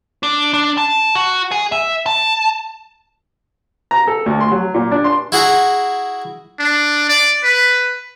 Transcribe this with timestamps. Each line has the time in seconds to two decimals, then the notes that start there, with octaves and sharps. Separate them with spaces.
0.23 D4
0.54 D4
0.77 A5
1.15 F#4
1.51 G#4
1.72 E5
2.06 A5
3.91 A#5
4.07 A4
4.26 D2
4.40 C6
4.51 F#3
4.74 A#2
4.91 D4
5.04 C6
5.32 E4 F#4 G#4 A#5
6.59 D4
7.09 D5
7.44 B4